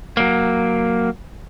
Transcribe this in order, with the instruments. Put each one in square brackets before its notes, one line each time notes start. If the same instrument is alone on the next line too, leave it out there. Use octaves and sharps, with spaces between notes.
[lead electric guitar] F#3 A#3